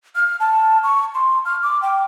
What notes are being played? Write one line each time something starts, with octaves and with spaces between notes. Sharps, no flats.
F6
A5
C#6
C6
F6
D6
G5